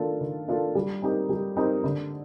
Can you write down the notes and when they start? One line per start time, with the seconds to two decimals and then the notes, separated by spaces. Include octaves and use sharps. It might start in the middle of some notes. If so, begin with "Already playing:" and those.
Already playing: D#3 A#3 D4 F4 A4
0.21 D#3
0.48 A#3 D4 F4 A4
0.75 G3
1.02 C4 D#4 G4 A#4
1.29 G3
1.56 C4 D#4 G4 A#4
1.84 D3